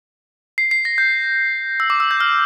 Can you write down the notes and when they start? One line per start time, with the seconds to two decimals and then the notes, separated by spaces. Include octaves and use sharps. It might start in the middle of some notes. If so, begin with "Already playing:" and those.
0.58 C7
0.71 C7
0.85 A#6
0.98 G6
1.80 E6
1.90 D6
2.00 E6
2.11 G6
2.20 F6